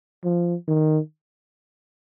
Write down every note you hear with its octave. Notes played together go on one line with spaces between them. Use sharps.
F3
D#3